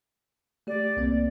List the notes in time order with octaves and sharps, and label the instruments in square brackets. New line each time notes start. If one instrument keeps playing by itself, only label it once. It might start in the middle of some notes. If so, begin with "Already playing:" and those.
[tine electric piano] A3 G4 [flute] D5
[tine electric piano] C2 A#3 C4